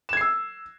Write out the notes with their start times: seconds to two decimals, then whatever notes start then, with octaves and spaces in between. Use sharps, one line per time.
0.09 E7
0.13 G#6
0.17 C7
0.21 E6